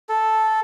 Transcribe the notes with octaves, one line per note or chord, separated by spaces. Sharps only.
A4